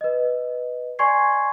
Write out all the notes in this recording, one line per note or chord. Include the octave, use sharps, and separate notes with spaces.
B4 D#5
D5 G#5 C6 C#6 G#6 C7